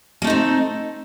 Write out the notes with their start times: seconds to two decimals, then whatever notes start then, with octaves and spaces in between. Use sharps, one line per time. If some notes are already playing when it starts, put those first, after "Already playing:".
0.22 A#3
0.24 A3
0.27 D#4
0.30 C4